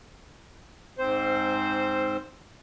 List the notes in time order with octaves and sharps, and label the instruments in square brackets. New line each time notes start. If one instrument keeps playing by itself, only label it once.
[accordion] G#2 C4 C5